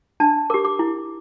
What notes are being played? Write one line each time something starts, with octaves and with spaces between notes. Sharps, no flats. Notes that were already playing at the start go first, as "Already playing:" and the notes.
D4 A5
G4 A#4 D6
D6
E4